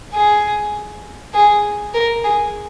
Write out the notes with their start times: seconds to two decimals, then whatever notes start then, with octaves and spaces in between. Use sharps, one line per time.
0.14 G#4
1.34 G#4
1.94 A#4
2.24 G#4